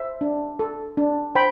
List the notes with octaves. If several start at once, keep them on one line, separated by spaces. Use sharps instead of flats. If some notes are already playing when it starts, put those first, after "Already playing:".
Already playing: C5 E5
D4
A4
D4
C5 G5 B5